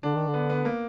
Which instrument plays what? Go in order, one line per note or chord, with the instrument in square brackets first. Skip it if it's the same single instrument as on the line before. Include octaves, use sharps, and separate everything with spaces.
[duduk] D3 [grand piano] D4
[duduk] D#3
D3
[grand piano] B3
B3
A#3